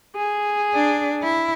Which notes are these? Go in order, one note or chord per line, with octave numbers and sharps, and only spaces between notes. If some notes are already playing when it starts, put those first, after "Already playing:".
G#4
D4
E4